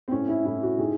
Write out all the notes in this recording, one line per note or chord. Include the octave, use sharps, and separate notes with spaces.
C4
A2 C#4
E4
A2 E4
F#4
D#3 G#4